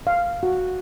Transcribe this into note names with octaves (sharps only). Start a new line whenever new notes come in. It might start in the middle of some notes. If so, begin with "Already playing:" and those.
F5
F#4